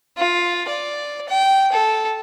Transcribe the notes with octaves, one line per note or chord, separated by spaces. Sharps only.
F4
D5
G5
A4